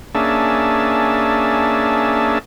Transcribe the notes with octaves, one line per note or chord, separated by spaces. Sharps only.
A#3 C#4 D4 G#4 E5 A5